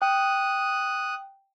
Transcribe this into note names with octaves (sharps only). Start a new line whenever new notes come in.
G5 D#6 F#6